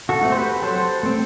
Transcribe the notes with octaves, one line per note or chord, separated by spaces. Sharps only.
F#4 A4
A3 C4
C5
G4 B4
F#3 A4 C5
A3 C4